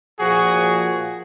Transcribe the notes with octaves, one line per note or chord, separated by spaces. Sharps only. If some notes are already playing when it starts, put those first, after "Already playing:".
A#2 F3 F#4 G#4